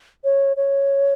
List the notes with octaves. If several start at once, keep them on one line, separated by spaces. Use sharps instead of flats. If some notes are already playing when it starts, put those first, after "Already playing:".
C#5
C#5